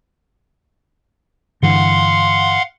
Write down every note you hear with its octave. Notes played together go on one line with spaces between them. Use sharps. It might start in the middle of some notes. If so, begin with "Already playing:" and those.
G2 D3 E3 F5 F#5 C6